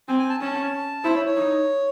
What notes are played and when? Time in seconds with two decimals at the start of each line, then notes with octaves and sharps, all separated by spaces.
0.08 C4 G#5
0.19 G#5
0.30 A5
0.40 C#4 A5
1.04 E4 C5
1.15 C#5
1.26 C#5
1.36 D#4